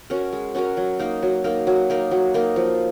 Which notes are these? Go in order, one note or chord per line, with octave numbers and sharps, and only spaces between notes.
C#4 F#4 A#4
G#3
C#4 F#4 A#4
F#3
A#3 D#4 A#4
F#3
A#3 D#4 A#4
F#3
A#3 D#4 A#4
F#3
A#3 D#4 A#4
F3